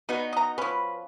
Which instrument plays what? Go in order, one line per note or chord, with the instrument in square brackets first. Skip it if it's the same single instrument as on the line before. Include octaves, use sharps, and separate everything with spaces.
[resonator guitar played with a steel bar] B3 D#4 F#4 [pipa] B4
[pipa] D#5 A#5
[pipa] F3 C#4 [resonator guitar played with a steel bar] B4